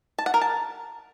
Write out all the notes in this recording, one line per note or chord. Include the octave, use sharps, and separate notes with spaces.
A5
F#5
A#4
A5